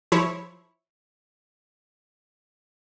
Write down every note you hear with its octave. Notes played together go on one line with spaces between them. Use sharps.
F3 E4 C#5